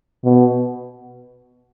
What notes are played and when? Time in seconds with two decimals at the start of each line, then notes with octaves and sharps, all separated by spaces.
0.24 B2